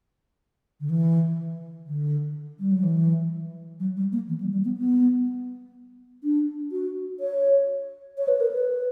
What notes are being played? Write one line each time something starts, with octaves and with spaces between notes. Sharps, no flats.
D3
E3
D3
G3
F#3
E3
F#3
G3
A#3
E3
G3
G3
B3
B3
D4
F#4
C#5
C#5
B4
A#4
B4